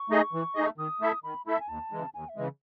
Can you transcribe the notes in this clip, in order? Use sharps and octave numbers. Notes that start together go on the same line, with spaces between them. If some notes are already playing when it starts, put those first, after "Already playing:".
Already playing: C#6
A3 D#4 G#4 D#5
E3
A3 D#4 G#4 D#5
D#3 D#6
A3 E4 A4 E5
D#3 B5
A3 E4 A4 E5 B5
G#5
D#2 A5
C#3 E3 G#3
D#2 G#5
E5
C#3 E3 G#3